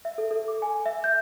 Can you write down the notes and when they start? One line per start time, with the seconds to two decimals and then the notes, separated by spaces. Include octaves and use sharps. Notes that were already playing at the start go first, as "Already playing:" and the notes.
0.05 E5
0.18 A4
0.31 A4
0.48 D6
0.62 G#5
0.86 E5
1.04 G6